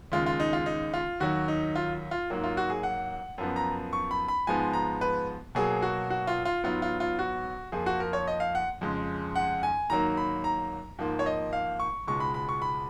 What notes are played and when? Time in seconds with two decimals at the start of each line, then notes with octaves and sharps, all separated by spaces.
0.12 D#2 C#3 G#3 F4
0.26 F4
0.40 D#4
0.53 F4
0.66 D#4
0.94 F4
1.20 D#2 D#3 F#3 F#4
1.48 D#4
1.75 F4
2.11 F4
2.30 G#2 F#3 A#3
2.44 F4
2.57 F#4
2.70 G#4
2.83 F#5
3.38 F#2 F3 B3
3.56 A#5
3.93 C#6
4.11 B5
4.28 B5
4.47 G#2 F3 G#3 B3 G#5
4.73 A#5
5.01 B4
5.55 B2 F#3 A#3 G#4
5.82 F#4
6.10 F#4
6.27 F4
6.45 F4
6.64 G#2 F#3 B3 F4
6.82 F4
7.00 F4
7.19 F#4
7.72 F2 F3 A#3 G#4
7.86 F#4
8.00 A#4
8.13 C#5
8.27 D#5
8.40 F5
8.55 F#5
8.81 F2 C#3 G#3
9.36 F#5
9.63 G#5
9.90 G#2 D#3 F#3 A#3 A#5
10.17 B5
10.44 A#5
10.99 G#2 F3 A#3
11.19 C#5
11.26 D#5
11.53 F5
11.80 C#6
12.07 C#2 B2 G#3 C#6
12.20 B5
12.34 B5
12.49 C#6
12.62 B5